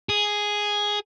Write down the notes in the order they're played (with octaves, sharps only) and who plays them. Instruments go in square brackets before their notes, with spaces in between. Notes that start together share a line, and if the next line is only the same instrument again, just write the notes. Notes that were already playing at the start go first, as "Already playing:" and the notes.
[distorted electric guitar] G#4